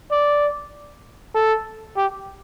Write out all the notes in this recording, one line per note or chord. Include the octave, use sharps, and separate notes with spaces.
D5
A4
G4